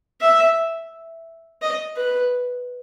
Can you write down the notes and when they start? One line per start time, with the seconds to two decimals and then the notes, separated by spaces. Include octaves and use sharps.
0.21 E5
1.62 D#5
1.96 B4